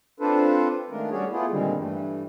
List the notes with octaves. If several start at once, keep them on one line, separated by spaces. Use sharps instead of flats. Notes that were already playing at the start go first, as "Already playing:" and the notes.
C4 D4 F4 A4 B4 C5
D#3 G#3 A3 D4 F4 A#4
G3 C#4 F#4 G#4 C#5 D5
A3 B3 E4 F4 G#4
A#2 D3 D#3 G3 G#3 C4
G2 E3 G3 A3